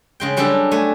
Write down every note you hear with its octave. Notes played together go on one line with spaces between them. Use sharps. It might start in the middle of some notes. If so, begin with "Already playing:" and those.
C#3 G#3 G5
F#3 G3 C#4 D4 A4
A3 G#5